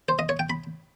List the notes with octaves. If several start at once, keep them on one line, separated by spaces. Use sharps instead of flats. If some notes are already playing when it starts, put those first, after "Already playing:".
C5
D#5
C#5
G5
B5